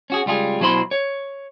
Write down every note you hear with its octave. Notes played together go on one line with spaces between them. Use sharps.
C#4 F#4 G#4
C#2 G3 F4 G#4
B2 F#3 E4 C5 B5 C6
C#5